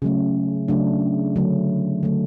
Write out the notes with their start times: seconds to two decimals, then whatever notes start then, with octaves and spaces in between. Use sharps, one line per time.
0.02 C#3 F#3 A3 C#4
0.68 C#3 F#3 A3 D4
1.36 D3 F#3 A3
2.03 D3 F#3 A3